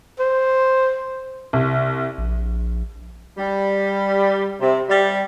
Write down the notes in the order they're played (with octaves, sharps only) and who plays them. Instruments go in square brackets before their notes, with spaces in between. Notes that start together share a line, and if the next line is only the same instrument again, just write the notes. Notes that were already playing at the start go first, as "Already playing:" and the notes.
[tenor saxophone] C5
[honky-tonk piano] C2
[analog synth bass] A#1
[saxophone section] G3
C3
G3